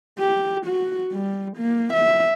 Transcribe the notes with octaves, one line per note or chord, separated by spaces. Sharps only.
G4
F#4
G3
A#3
E5